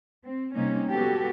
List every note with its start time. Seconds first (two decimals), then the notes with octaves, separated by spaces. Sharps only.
0.23 C4
0.55 C3 G3 A#3 C#4 D#4
0.90 G#3 B3 F#4 G4 A4